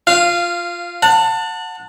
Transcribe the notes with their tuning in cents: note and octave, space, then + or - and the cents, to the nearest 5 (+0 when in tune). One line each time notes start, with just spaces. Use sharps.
F4 +0 F5 -15
F#5 -20 A5 +25